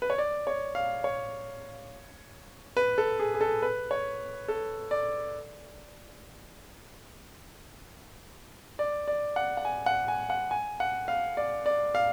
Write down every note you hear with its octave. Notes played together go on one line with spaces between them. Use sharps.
B4
C#5
D5
C#5
F5
C#5
B4
A4
G#4
G#4
A4
B4
C#5
A4
D5
D5
D5
F#5
F#5
G#5
F#5
G#5
F#5
G#5
F#5
F5
D5
D5
F5